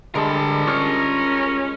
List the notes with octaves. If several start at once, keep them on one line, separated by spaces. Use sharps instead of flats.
D3 G3 G#3 A#4 A5
C#4 F4 C#6 F6